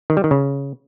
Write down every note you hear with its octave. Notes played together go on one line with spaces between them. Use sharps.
D#3
G3
D#3
C#3